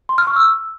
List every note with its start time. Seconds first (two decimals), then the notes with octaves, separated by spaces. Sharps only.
0.09 C6
0.18 F6
0.27 C#6
0.36 E6